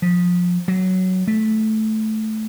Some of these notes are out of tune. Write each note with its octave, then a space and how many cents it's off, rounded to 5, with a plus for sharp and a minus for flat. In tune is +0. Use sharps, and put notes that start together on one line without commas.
F3 +25
F#3 +5
A3 -10